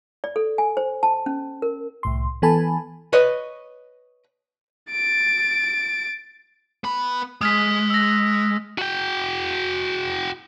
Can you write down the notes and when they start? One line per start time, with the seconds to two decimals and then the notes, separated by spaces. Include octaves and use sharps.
0.24 D5
0.36 A4
0.58 G#5
0.77 C5
1.03 A5
1.26 C#4
1.62 A#4
2.03 C2 A2 C6
2.42 E3 B3 A4 G#5 A5 B5
3.13 B4 C#5 D#5
4.91 A6 D7
6.84 B3 B5
7.41 G#3 D#6 F6 B6
7.90 E6 A#6
8.78 F#4 G5